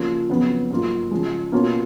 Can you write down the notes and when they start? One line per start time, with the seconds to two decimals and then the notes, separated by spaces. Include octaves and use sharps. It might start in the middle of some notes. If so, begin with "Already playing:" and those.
Already playing: C#3 F3 A#3 C#4 F4
0.30 F2 C#3 F#3 B3
0.70 G#2 F#3 A#3 F4
1.11 C#3 F3 G#3
1.52 B2 A#3 C#4 F4